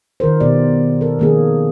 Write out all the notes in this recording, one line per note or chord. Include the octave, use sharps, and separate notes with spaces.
D#3 F4 A#4 C5
B2 B3 G4 D5
A4 A#4
D#3 F3 A#3 C#4 G#4